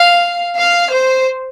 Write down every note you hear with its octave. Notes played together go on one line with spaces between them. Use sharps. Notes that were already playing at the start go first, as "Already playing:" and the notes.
Already playing: F5
F5
C5